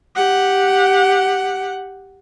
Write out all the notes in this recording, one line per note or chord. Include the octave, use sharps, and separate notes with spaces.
G4 F#5